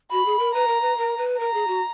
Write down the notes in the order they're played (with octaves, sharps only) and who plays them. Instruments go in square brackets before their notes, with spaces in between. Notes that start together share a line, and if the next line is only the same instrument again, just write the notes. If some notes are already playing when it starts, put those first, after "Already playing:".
[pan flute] F#4 [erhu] B5
[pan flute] G#4
A#4
[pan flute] B4 [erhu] A#5
[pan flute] A#4
B4
A#4
B4
[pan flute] A#4 [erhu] A#5
[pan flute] G#4
F#4